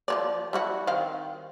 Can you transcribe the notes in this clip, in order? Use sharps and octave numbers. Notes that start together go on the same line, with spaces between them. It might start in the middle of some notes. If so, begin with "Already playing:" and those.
F3 C#5 D5
G3 E4 F#4
D#3 C4 F5